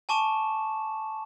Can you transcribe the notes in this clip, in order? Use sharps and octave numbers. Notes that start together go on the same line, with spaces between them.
G#5 A5 C#6 D6 E7